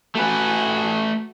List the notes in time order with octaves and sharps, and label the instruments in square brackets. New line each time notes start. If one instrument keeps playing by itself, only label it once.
[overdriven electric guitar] A3 B4 [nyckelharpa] F#4 G#5